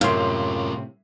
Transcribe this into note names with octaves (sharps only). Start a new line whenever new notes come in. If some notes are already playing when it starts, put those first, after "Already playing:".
F#2 A2 C3 C#4 F4 F5 C6